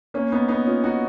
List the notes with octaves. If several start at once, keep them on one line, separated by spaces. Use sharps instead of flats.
A#3 C#4
B3 D#4
B3 D#4
C#4 F4
D#4 F#4